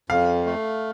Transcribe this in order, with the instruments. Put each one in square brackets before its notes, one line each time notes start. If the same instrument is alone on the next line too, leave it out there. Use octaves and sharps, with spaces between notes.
[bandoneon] F2 [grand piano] F5
[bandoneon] A3